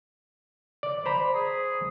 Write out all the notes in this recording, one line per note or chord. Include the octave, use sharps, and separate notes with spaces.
D5
C5 A#5 B5
G#4